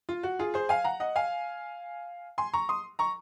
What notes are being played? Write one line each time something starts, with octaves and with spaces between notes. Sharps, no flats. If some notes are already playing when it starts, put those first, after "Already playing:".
F4
F#4
F4 G#4
G#4 C5
F5 G#5
F#5 A#5
D#5 F#5
F5 G#5
G#5 C6
A#5 C#6
C6 D#6
A#5 C#6